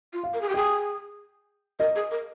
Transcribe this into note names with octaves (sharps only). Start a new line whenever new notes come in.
F4
F5
A#4
G#4
G4
G#4 G5
A#4 D#5
G#4
A#4